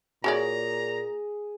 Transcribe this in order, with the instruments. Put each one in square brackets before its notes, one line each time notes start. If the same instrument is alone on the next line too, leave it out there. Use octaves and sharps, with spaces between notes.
[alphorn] A#2 [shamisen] F#4 C#5 D5 [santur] G#4 [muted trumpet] A#5